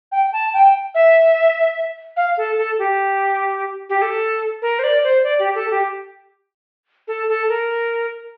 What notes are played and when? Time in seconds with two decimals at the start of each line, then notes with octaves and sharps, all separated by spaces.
0.12 G5
0.33 A5
0.54 G5
0.95 E5
2.17 F5
2.37 A4
2.57 A4
2.79 G4
3.89 G4
4.02 A4
4.62 A#4
4.79 C5
4.84 D5
5.04 C5
5.24 D5
5.39 G4
5.55 A4
5.71 G4
7.08 A4
7.28 A4
7.49 A#4